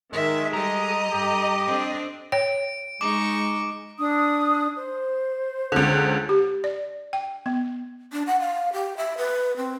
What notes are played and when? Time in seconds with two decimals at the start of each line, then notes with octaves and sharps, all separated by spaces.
0.13 D#3 G#3 E5
0.54 G3 G4 A4 D#5 A#5
1.12 G2 G4
1.67 C4 D4
2.32 C#5 G5 D7
3.01 G#3 D#4 C#6 D6
3.98 D4 D#6
4.76 C5
5.72 C#2 D3
6.29 G4
6.64 D5
7.13 G5
7.46 B3
8.12 D4
8.27 F#5
8.40 F5
8.73 G4
8.97 E5
9.18 B4
9.57 C4